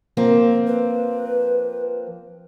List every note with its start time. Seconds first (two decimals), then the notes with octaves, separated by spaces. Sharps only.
0.17 F3 A#3 C4
0.67 B4